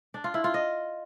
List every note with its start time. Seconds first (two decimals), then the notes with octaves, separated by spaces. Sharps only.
0.14 D4
0.24 F4
0.34 E4
0.44 F4
0.54 D#5